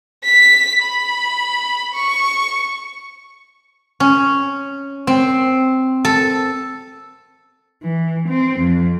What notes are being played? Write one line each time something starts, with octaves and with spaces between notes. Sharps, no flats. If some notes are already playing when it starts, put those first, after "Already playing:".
B6
B5
C#6
C#4
C4
A4
E3
C4
F2